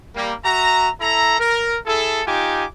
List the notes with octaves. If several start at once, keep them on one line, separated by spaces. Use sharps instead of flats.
G3 A#3
F#4 E5 A#5
E4 A4 A#5
A#4
E4 G#4 A4
D#4 F4 G4 G#5 D6